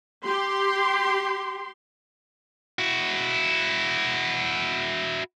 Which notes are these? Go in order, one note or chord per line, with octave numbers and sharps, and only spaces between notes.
G4 C6
E4 F#4